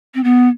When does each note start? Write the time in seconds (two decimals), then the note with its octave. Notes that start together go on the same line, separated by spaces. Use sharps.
0.14 C4
0.24 B3